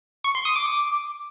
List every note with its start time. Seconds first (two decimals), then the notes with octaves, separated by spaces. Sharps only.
0.24 C#6
0.35 C6
0.45 D#6
0.56 D6
0.66 D6